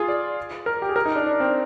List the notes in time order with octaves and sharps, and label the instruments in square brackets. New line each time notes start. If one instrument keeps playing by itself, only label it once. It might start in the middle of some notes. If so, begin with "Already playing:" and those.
Already playing: [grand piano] F4 G#4
D5
A#4
G4
G#4
A#4
D#4
D4
D4
C4